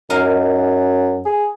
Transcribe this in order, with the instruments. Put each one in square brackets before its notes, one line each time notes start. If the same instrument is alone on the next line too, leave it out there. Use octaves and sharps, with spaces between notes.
[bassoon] F#2 [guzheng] D#4 A#4 F5
[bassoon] G#4